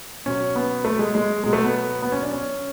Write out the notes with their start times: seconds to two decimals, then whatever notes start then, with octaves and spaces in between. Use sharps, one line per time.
0.26 B2 F#3 C#4
0.56 B3
0.85 A3
0.99 G#3
1.15 G#3
1.44 B2 F#3 G#3
1.53 A3
1.64 B3
2.02 B3
2.12 C#4
2.22 D4
2.32 C#4